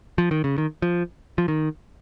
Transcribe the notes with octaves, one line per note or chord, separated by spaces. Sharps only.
F3
D#3
C#3
D#3
F3
F3
D#3